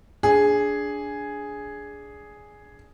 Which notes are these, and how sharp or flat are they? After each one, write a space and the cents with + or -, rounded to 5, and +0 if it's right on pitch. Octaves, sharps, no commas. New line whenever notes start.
D4 -15 G#4 +0